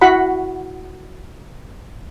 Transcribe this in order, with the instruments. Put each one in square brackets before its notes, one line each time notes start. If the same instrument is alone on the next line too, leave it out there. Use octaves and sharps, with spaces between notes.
[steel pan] E4 F#4 F#5 B5